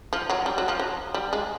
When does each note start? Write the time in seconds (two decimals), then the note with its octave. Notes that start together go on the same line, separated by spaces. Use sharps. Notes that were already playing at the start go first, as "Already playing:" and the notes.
0.13 F3
0.30 F#3
0.46 G3
0.58 F#3
0.68 F3
0.80 F#3
1.14 G3
1.33 G#3